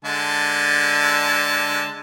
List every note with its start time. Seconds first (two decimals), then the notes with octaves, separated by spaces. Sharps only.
0.05 D3 G#3 A5